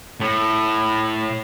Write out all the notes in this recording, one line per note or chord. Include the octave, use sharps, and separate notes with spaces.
A2